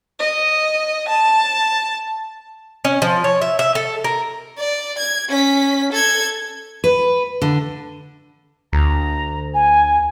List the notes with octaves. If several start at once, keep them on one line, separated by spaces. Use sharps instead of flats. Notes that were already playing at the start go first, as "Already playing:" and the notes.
D#5
A5
C#4
F3
C#5
E5
E5
A4
A#4
D5
G#6
C#4 B6
A4 G#6
B4
D3
D2 A#5
G#5